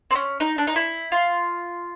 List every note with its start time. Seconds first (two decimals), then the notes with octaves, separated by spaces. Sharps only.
0.11 C4
0.15 C#4
0.40 D#4
0.58 D4
0.67 D#4
0.76 E4
1.12 F4